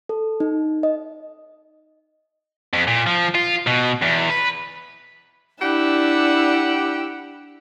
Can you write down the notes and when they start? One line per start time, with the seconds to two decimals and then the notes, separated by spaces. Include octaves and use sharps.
0.09 A4
0.40 D#4
0.83 D#5
2.73 F2
2.87 A#2
3.06 F3
3.35 F4
3.67 B2
4.02 E2
4.30 B4
5.61 D4 E4 G4 F#5 E6